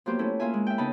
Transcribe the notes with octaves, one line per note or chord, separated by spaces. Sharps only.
F3 F#3 A#3 B3 G4 C5
A3 C#4 E4 A4
A#3 C#4 F4 E5 G#5
G#3
E5 G5
C#3 B3 D#4 D#5 A5 B5